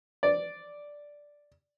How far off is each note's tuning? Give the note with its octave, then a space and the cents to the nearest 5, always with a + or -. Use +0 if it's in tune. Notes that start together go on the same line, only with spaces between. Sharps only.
D5 +0